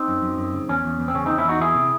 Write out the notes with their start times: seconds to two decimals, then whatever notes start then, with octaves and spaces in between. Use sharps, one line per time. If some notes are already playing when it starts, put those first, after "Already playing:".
Already playing: C4 D#4
0.08 F#2
0.22 F#2
0.38 F#2
0.54 C#3
0.69 E2 C#4
0.85 E2
0.99 E2
1.08 C4
1.14 C#3 C#4
1.26 E2 C4 D#4
1.38 C#4 E4
1.44 E2 D#4 F#4
1.60 E3 E4 G#4
1.75 C3